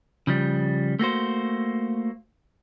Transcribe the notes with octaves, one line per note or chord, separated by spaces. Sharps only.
C#3 F3 G3
A3 A#3 F#4 C5